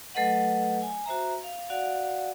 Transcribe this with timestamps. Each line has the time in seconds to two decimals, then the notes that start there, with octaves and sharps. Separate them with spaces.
0.15 F#3 A3 A4 B4 D#5 F#5
0.82 G#5
1.06 F#4 C5 E5 A#5
1.44 F5
1.70 F#4 D5 F5 F#5